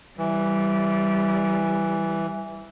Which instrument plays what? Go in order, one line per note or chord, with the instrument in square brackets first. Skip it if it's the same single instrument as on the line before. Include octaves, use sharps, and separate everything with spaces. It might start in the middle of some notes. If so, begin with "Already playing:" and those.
[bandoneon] E3 [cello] G3